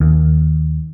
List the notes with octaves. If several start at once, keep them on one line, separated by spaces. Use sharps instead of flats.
D#2